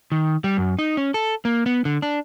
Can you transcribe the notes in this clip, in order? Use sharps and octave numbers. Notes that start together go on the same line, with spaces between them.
D#3
G3
F#2
D#4
C#4
A4
A#3
B3
D3
D4